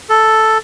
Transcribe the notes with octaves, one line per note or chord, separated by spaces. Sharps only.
A4